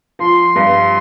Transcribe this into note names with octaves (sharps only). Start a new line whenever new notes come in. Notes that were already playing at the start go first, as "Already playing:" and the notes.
F3 C6
G2